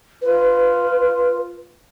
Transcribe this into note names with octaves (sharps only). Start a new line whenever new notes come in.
F4 B4